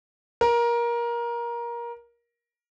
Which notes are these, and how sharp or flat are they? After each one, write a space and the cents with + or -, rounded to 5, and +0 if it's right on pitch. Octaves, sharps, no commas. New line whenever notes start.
A#4 +20